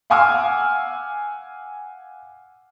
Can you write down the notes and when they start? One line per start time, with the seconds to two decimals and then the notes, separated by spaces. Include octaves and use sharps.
0.10 F5 F#5 G#5 D6 E6 F6